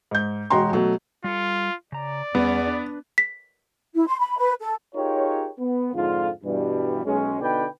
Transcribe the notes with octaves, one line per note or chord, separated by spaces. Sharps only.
G#2 G6
E1 G#3 F#4 G5 A#5 C6
B2 F#3 A3
G3 F4 A4
C#3 D5 A#5
E2 G3 B3 C#4
D4 B4
B6
E4
C6
B5
B4
A4
D#4 F4 G4 G#4 A#4 C#5
B3
F2 G#2 D3 F4
G2 B2 E3 G3
B1 G#3 C#4
B2 D3 D#4 B4 D5 G5